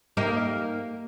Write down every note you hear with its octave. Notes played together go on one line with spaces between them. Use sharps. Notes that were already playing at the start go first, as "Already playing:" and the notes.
A#3 D#4 G4